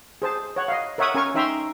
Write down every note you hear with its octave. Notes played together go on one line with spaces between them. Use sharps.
G#4 C5 A5
C#5 F#5
D#5 F5
A#4 C#5 E5 F#5 C#6 D#6
C#4 A#4 G#5 C#6
C#4 D#4 E5 G5 A#5 C6